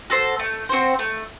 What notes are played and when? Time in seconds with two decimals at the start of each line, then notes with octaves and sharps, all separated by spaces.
0.10 F#4 A4 C5
0.39 A3
0.69 C4 F#4 C5
0.99 A3